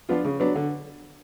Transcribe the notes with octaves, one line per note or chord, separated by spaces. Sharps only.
F3 B3 D4 F4
C#3
F#3 B3 D4
D3